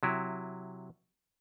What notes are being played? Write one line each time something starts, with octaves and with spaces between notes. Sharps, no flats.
C3 F#3 E4